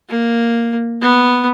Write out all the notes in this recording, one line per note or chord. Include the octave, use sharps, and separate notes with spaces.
A#3
B3